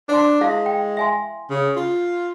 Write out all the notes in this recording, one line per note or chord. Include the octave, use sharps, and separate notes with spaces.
D4 C5 A5 C6
G#3 E4 F5
G5
E5 G#5 C6
C#3
F4